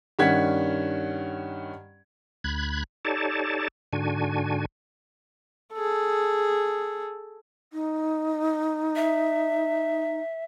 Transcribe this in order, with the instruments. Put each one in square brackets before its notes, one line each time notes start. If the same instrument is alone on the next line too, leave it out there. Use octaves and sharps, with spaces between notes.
[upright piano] G2 D#3 C#4 F#5 G#6 B6
[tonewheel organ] D2 B5 F#6 G#6
D#4 G4 A4 C#5 D5 A5
G#2 D3 D4 F#4 G#5
[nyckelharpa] G#4 A4
[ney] D#4
[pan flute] E5